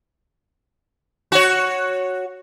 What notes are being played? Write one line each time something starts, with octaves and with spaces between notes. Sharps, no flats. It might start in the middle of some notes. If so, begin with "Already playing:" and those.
F#4 C#5